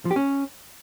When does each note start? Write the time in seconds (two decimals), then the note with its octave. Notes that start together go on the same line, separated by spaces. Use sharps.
0.05 F3
0.11 G4
0.16 C#4